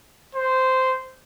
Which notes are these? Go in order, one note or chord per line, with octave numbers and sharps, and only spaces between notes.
C5